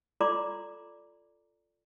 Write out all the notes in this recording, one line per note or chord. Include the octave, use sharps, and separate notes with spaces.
F4 A4 D5 A#5 C6 D6